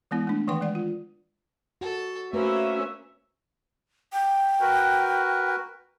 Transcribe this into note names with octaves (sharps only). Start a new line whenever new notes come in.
E3 G#3 B3 E4
A3 D4
D#3 E3 B4 F#5 G5 C6
G#3 D5 F#5
F4
F#4 A4
A3 A#3 C#4 F#4 B4 C5 E5 F5
G5
F#4 A#4 B4